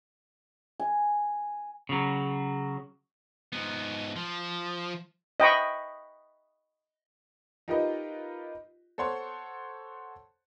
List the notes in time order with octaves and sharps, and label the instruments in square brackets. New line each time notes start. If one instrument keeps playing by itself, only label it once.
[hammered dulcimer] G#5
[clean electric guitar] C#3 F#3
[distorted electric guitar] G#2 B3
F3
[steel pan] D#5 G5 B5 C#6
[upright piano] D#4 F4 G4 A#4 B4 D#5
A4 C5 C#5 F#5 C6